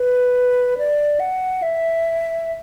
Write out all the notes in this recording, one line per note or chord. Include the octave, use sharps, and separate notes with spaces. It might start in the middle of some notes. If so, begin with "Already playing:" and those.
Already playing: B4
D5
F#5
E5